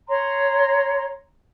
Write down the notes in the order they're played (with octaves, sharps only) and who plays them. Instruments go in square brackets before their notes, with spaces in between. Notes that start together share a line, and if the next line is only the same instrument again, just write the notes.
[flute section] C#5 A#5 C6